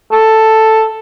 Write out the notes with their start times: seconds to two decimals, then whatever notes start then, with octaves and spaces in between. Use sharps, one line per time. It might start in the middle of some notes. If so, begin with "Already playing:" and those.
0.12 A4